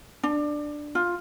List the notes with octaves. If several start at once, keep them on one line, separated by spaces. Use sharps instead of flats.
D4
F4